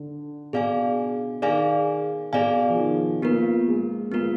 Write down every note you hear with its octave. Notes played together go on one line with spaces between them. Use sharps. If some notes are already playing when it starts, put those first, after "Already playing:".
Already playing: D3
B2 G#4 D5 F5 G#5
D#3 G#4 D5 F5 G#5
B2 G#4 D5 F5 G#5
F3
D#3
A#3 B3 F4 A#4
G#3
G#3 B3 F4 A#4